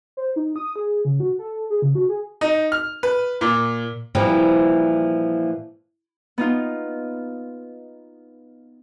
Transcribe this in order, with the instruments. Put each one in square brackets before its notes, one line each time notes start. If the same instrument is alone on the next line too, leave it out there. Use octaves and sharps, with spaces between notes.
[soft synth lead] C5
D#4
D#6
G#4
C#3
F#4
A4
G#4
C#3
F#4
G#4
[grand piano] D#4
F6
B4
A#2
[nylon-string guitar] A#2 E3 F3 G3 A#3 C4
[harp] B3 D#4 F4